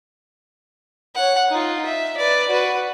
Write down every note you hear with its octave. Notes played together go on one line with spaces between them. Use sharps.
C#5 F#5
D#4 F4
E5
B4 D5
F#4 B4